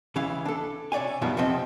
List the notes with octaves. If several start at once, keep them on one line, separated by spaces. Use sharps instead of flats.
C#2 E3 C#4 E4 F5
D4 A4
C3 C#5 D5 F5 G#5
F#2 B2 D#3 F3 G3
E2 C3 F3 C4 D#5